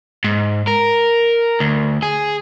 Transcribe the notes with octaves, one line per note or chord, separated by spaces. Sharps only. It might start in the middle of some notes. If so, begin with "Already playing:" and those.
G#2
A#4
D2
G#4